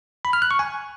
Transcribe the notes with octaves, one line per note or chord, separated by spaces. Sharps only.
B5
F6
F#6
C#6
G#5